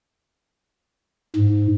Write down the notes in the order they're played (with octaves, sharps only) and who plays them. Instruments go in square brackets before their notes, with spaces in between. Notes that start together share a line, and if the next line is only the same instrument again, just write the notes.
[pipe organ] G#2